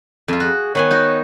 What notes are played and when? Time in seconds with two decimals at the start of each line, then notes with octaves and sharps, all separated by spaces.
0.28 F2 F4
0.40 F#4 G#4
0.75 D#3 B3 C#5 G#5
0.91 D#4 F#4